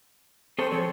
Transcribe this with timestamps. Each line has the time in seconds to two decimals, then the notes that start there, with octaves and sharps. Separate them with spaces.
0.59 C4 G#4 A4 C5 C#5
0.72 F3 C4 A4 C#5